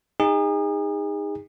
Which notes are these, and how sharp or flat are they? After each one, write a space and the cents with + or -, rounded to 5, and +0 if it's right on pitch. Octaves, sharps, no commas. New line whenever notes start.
D#4 +0 G#4 -35